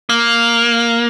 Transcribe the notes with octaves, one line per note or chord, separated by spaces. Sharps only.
A#3